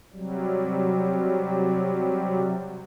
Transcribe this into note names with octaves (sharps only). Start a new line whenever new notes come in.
C3 F#3 G3